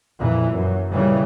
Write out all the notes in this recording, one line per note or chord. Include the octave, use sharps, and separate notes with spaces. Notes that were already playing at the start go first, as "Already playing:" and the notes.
F2 A#2 E3
F#2
A#2 C#3 E3 G3